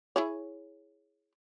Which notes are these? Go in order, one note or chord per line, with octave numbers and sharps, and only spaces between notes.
E4 G#4 C#5